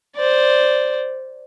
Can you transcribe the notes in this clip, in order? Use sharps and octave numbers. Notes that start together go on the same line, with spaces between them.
C5 D5